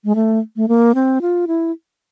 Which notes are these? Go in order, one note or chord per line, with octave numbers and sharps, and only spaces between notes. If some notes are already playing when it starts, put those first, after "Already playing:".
G#3
A3
A3
A#3
C4
F4
E4